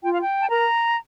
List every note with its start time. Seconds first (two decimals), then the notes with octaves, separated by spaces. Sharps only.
0.03 F4 G5
0.12 F5
0.21 G5
0.41 A5
0.49 A#4 A#5